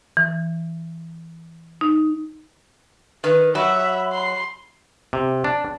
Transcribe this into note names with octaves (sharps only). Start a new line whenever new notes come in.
E3
D#4
D#3 B4
F#3 E5 B5
C6
C3
D4